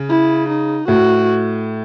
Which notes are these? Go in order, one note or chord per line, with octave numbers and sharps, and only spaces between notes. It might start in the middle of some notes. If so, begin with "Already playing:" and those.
Already playing: C#3
E4
D#4
A2 F#4